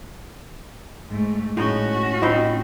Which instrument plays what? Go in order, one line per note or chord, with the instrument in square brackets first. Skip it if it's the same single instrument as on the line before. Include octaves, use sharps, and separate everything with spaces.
[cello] G#2 A3
[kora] A2 D#4 D#5 [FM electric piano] G#3 [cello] C#4 F#4
[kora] A2 C4 D#4 [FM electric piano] F4 D#5 B5